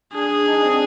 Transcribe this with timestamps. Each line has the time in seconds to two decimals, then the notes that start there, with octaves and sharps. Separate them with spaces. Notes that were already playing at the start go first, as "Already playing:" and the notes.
0.13 D4 G#4
0.46 D#4
0.54 D4
0.63 C4
0.71 D4